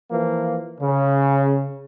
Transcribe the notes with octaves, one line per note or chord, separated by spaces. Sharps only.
E3 F3 A#3
C#3